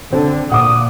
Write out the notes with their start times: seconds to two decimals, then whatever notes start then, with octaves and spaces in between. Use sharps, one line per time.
0.13 D3 C4
0.51 A#2 F#5 D6 D#6